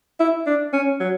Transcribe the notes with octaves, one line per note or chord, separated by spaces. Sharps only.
E4
D4
C#4
F#3